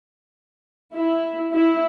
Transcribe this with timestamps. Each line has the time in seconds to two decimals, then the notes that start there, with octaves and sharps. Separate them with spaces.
0.95 E4
1.52 E4